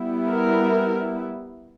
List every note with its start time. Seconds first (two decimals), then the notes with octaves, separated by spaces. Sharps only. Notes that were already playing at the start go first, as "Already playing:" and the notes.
Already playing: G3 B3 E4
0.28 A#4